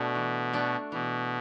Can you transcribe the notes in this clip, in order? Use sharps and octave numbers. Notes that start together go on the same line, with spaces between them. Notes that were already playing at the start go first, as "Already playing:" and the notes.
Already playing: B2 A3 D4 F#4
E3
A3 D4 F#4
B2 E3